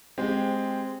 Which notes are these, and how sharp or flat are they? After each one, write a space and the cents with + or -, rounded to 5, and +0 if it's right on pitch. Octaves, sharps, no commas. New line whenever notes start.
G#3 +0 C4 +0 G4 +10